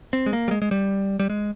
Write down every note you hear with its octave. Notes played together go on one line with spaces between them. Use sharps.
C4
G#3
A#3
G3
G#3
G#3
G3
G3
G#3